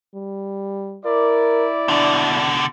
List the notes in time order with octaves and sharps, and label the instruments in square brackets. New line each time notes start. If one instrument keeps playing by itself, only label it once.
[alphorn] G3
[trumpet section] E4 D5 [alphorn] A#4
[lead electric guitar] B2 D3 [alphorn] D4